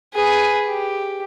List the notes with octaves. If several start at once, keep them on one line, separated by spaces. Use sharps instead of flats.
G#4 B4
G4